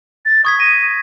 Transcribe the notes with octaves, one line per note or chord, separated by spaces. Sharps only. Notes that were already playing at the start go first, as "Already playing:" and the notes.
A6
C#6 D#6 G#6 B6
A#6 D#7